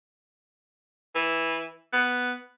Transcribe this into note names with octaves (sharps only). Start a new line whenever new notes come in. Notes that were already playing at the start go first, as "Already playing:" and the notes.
E3
B3